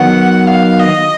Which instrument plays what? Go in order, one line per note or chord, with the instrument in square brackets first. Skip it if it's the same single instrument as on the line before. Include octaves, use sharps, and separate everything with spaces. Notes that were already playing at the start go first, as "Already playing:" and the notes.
Already playing: [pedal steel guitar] D#3 F#3 B3 [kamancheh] F#5
[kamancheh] F5
D#5